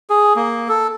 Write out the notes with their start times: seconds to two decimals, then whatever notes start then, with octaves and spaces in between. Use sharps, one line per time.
0.10 G#4
0.36 A#3
0.69 A4